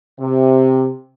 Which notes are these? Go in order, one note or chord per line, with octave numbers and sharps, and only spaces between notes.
C3